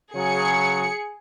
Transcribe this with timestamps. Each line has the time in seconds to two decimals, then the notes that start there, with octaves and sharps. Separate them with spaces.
0.14 C#3 F#3 G#4 C#7